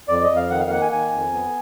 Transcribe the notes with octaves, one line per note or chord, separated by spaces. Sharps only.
F2 D5
D#5
F2
F5
D#3 F#5
F5
A#3 F#5
G#5
D#3 G#5
F2
B3